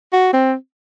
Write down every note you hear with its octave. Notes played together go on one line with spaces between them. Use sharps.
F#4
C4